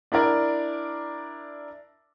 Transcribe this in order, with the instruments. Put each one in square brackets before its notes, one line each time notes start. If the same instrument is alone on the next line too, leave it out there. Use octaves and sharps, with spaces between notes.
[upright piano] D4 E4 A#4 D5